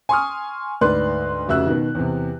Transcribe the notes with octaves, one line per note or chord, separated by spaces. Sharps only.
G#5 C6 C#6 D#6 F6
D2 G#2 B4 D5 C6 F#6
F1 C#3 F#4 E5 E6 F#6
B2 D#3
E2 C3